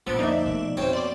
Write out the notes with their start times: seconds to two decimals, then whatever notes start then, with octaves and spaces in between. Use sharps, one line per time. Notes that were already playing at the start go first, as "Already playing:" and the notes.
0.07 A#1 F3 B3 E6 A6 D7
0.19 F2 D3 A#3 D#4 D5 E5
0.46 B2 A3
0.77 F2 B2 C#4 C5 C#5 G5
0.93 D5 C6 D6